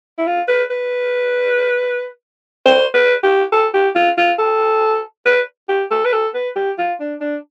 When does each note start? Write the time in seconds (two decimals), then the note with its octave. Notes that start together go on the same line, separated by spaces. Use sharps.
0.18 E4
0.27 F4
0.48 B4
0.71 B4
2.66 C5
2.94 B4
3.23 G4
3.52 A4
3.74 G4
3.95 F4
4.18 F4
4.39 A4
5.26 B4
5.69 G4
5.91 A4
6.05 B4
6.13 A4
6.34 B4
6.56 G4
6.79 F4
7.00 D4
7.21 D4